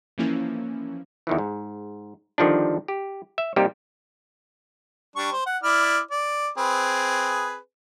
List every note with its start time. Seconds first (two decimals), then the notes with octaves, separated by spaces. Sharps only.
0.18 E3 F3 A#3 C#4 E4
1.27 E2 D#3 E3
1.38 G#2
2.38 D3 D#3 F3 G3 D4
2.88 G4
3.38 E5
3.56 C3 G3 A#3 D#4 G4
5.16 G3 D4 C#6
5.32 C5
5.46 F#5
5.63 E4 D5 F6
6.11 D5
6.58 C4 G#4 B4